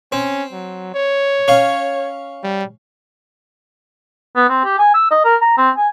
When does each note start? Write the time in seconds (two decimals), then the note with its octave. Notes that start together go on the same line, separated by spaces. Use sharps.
0.12 C4 C#4
0.52 F#3
0.95 C#5
1.48 C#4 F5
2.43 G3
4.36 B3
4.49 C4
4.65 G4
4.79 G#5
4.94 E6
5.11 D#5
5.25 A#4
5.41 A#5
5.58 C4
5.77 G#5